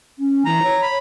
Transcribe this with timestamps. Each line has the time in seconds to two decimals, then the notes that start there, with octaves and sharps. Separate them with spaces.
0.19 C#4
0.46 E3 A#5
0.63 C#5
0.82 B5